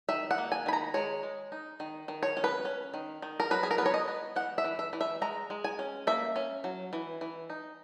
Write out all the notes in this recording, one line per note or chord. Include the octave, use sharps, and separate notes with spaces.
D#3 E5
F#5
A#3
G#5
D#3 B5
A#5
G#3 C#5
G#3
D#4
D#3
D#3
C#5
C#4
B4
C#4
D#3
D#3
A#4
F#3 B4
G#4
A#4
B3 B4
C#5
D#5
B3
E3 F#5
E5
E3
E5
E3
E5
G#3 A#5
G#3
G#5
C#4
A#3 E5
C#4
F#3
E3
E3
D#4